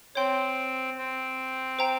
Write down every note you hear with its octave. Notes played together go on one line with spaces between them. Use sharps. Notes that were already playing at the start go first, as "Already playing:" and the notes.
C4 C#5 G5 C6 G6
C4
C5 G5 A#5